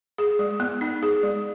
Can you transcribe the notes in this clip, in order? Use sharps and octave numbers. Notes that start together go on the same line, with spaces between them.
G#4
G#3
B3
D#4
G#4
G#3